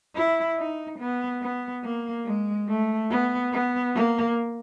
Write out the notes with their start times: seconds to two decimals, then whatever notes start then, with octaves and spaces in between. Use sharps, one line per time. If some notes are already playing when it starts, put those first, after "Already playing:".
0.16 E4
0.58 D#4
1.00 B3
1.42 B3
1.84 A#3
2.26 G#3
2.69 A3
3.11 B3
3.53 B3
3.95 A#3